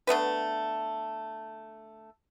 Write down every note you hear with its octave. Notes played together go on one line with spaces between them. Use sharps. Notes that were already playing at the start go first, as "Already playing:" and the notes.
D3 A3 B3 B4